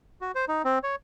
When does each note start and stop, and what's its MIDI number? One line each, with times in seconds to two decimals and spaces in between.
0.21 0.32 66
0.35 0.45 72
0.48 0.62 63
0.65 0.79 60
0.83 0.96 73